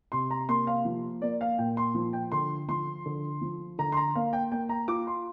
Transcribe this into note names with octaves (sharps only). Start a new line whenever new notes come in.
C3 C6
A#5
A#3 C6
F5
F3
A#3 D5
F5
A#2 G5
C6
F3
G5
D3 C6
F3 C6
D3
F3
D3 A#5
C6
A#5
A#3 F5
G5
A#3 G5
A#5
F4 D6
C6